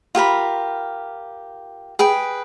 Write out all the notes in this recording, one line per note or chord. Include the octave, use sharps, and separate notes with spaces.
F4 G4 A#4 B5
G#4 B4 G5